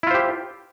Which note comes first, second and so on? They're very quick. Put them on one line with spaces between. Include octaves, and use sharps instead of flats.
E4 F4 C5 G4